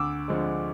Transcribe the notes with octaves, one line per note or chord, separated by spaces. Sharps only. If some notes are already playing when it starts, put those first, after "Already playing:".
Already playing: D2 D6 E6
D3 F3 G#3